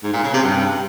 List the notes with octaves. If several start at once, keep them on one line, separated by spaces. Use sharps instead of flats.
G#2
A#2
C#3
C3
G2